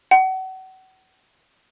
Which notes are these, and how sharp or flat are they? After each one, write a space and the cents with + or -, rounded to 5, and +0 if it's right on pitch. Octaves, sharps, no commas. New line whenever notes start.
F#5 +35